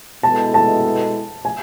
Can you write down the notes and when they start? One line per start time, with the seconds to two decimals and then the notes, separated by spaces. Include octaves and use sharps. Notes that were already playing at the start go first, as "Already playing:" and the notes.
0.23 B2 G#3 B3 E4 A4 A5
0.54 A5
1.45 G#5